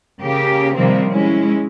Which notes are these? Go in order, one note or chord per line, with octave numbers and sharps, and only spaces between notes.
C#3 A#3 G4
C3 D#3 F3 G3 A#3 C4
G#3 C#4 E4